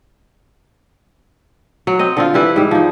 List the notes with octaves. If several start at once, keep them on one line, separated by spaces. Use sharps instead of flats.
F#3
C4 D#5
D3 C4 F4
E3 G3 E4 B4
G#2 G3
F3 D#4